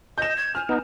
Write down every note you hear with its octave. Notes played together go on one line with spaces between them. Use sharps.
D#5 G6 E7
G#6
G#5 F6
B3 D#4